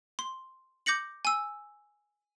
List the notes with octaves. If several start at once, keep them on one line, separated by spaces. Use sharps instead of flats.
C6
D6 G6 A#6 C#7 F#7
G#5 E6